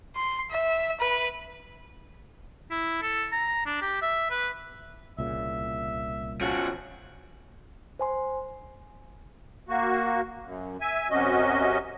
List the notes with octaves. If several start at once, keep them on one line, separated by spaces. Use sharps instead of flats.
C6
E5
B4
E4
A4
A#5
D4
G4
E5
B4
C2 A#2 C#3 E5
F3 C#4 F#4
C5 G#5 C6
A#3 F#4
F#2
E5 G#5
F#2 C3 C#4 F#4 D#5